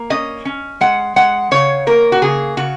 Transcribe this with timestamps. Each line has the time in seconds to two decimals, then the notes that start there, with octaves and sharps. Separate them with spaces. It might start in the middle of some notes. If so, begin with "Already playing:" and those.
Already playing: A#3
0.10 C#4 D#5
0.45 C#4
0.81 G#3 F#5
1.16 G#3 F#5
1.51 C#3 C#5
1.87 A#3 A#4
2.12 F#4
2.22 C#3 G#4
2.57 C#3 F#4